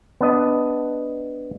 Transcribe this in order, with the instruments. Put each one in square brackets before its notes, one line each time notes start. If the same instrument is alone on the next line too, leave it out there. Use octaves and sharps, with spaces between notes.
[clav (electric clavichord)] B3 D4 D#5